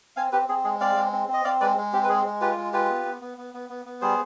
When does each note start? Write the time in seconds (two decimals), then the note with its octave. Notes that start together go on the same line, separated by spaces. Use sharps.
0.16 C4 F5 G#5
0.32 C4 G4 B4
0.49 C4 G#4
0.64 G#3 G#4
0.80 C4 D5 F5
0.96 G#3
1.13 C4
1.28 C4
1.33 D#5
1.44 C4 D5 F5
1.61 G#3 B4 D5
1.77 G#3
1.93 C4 G4
2.04 B4
2.09 G#3 G#4
2.25 G#3
2.41 F4 G4 B4
2.57 G#3
2.73 F4 G4 B4
2.89 B3
3.05 B3
3.21 B3
3.38 B3
3.54 B3
3.70 B3
3.85 B3
4.01 G3 G#4 C5